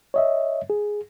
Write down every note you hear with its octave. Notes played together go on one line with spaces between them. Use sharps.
C#5 D#5 E5
G#4